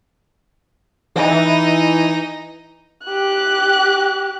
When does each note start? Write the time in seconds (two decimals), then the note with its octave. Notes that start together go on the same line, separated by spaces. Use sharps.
1.16 E3 D#4
3.05 G4 F#6